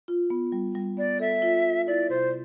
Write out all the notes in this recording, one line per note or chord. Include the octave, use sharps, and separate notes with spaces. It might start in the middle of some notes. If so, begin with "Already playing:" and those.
F4
B3
G3
G3
B3 D5
A4 E5
F4
F4
E4 D5
C3 C5